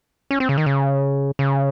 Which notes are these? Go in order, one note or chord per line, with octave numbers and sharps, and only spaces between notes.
C#4
C4
C#3
D#3
C#3
C#3